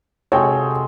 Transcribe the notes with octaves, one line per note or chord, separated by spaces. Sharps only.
C3 G#3 F#4 A4 C#5 G5